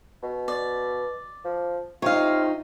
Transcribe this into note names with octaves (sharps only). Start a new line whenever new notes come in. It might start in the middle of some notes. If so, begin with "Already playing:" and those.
B2
D5
F3
C3 D#4 F4 C#5 F5